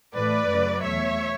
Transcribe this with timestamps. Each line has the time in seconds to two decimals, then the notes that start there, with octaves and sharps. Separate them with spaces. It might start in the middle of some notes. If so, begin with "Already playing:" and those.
0.15 A2 E3 A3 B4 D5
0.49 F#2 C#3 F#3 A3
0.82 E2 B2 A3 C#5 E5